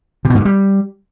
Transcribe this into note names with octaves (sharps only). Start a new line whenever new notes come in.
C3
B2
G#2
G2
G3